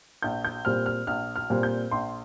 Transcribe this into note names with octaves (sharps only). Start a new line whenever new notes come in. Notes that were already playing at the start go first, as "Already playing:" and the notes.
A#1 G6
G6
A#2 G3 C4 F6
F6
A#1 F6
F6
A#2 G3 C4
G6
A#1 C6